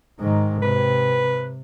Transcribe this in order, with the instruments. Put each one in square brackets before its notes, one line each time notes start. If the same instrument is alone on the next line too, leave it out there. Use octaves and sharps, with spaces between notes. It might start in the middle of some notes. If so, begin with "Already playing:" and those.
[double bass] G#2 D#3
[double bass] C3 [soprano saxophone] B4